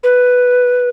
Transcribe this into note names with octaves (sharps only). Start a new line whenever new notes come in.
B4